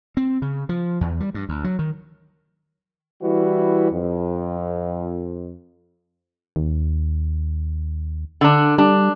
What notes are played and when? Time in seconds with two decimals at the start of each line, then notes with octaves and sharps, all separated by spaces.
0.17 C4
0.42 C#3
0.69 F3
1.01 E2
1.20 G3
1.34 G2
1.49 D2
1.64 F#3
1.79 D#3
3.22 E3 G3 E4 F#4 B4
3.92 F2
6.56 D#2
8.41 D3 D4
8.78 G3 D4